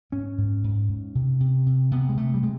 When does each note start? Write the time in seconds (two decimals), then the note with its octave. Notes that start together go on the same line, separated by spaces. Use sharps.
0.12 G#2 C#4
0.38 G#2
0.64 G#2
0.89 G#2
1.15 C3
1.40 C3
1.66 C3
1.91 C3 B3
2.09 G#3
2.17 C3 A3
2.34 G3
2.43 C3 G#3